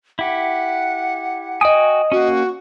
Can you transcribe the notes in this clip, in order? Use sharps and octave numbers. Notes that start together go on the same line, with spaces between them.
E4 G4 F#5
F#4 D#5 G5 G#5 D#6
A#3 C#4 F#4